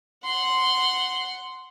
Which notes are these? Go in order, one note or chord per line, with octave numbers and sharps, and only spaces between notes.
F#5 C6